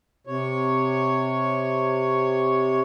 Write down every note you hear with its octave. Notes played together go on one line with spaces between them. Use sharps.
C3 C#5